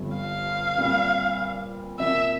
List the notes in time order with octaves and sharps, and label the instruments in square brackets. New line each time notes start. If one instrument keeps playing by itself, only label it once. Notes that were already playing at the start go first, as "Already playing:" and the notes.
Already playing: [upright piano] G1 G2 F3 A3 C4
[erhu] F5
[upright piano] A#2 G3 C4 F4
[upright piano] C3 F3 A#3 [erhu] E5